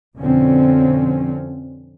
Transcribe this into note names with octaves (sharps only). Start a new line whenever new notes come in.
F2 B2 D3 F3 C4 C#4